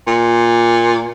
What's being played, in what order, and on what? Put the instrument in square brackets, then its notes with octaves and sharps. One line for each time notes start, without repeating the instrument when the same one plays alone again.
[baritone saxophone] A#2